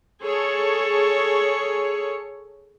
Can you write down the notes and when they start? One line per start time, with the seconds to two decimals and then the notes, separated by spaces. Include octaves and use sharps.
0.24 G#4 A4 C#5